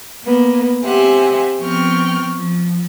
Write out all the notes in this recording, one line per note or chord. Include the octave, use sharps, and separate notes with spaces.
A#3 B3
C4 G4 C5 E5 F#5 G#5
F3 B3 C4 G5 C#6 F6
F3